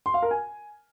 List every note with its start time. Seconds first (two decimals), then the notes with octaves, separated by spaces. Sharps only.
0.06 C6
0.14 F5
0.23 A#4
0.31 G#5